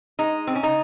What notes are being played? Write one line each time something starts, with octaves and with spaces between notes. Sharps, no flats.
G#3 D#4
C4
C#4
C#3 D#4